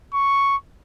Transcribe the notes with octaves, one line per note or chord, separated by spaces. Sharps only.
C#6